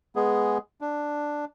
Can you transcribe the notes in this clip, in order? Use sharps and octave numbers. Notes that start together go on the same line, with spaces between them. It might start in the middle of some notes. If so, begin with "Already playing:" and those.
G#3 B3 G#4
D4